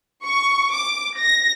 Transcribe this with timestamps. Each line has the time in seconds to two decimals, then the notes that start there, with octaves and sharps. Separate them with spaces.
0.23 C#6
0.73 D6
1.18 A#6